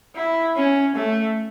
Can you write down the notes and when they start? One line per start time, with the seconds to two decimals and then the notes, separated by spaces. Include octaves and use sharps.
0.16 E4
0.56 C#4
0.96 A3